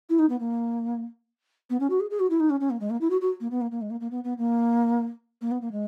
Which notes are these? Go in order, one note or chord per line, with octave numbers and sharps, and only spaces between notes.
E4
D#4
B3
A#3
B3
C#4
F#4
G#4
G#4
F#4
E4
D#4
C#4
C#4
A#3
G#3
A#3
E4
F#4
F#4
A#3
B3
A#3
A#3
G#3
A#3
A#3
B3
B3
A#3
A#3
B3
A#3
G#3